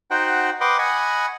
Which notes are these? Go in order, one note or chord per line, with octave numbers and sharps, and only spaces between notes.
D#4 F#4 C5 F#5 G5
B4 D#5 F#5 G5 C6 D6
D#5 F#5 G#5 B5 C#6